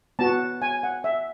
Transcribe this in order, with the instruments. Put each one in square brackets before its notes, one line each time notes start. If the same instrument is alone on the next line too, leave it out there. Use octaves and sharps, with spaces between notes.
[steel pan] B3 F#4 A5
G#5
F#5
E5